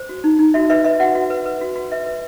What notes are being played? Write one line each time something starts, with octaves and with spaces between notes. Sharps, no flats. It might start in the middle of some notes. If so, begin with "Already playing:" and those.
Already playing: C5
F#4
D#4
D#4
F#4 E5
B4 E5
B4 E5
F#4 F#5
F#4
B4
B4
F#4
F#4
B4 E5
B4